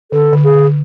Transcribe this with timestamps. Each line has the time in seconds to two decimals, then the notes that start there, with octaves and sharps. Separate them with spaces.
0.12 D3 A4
0.33 D3
0.44 G#4
0.55 D3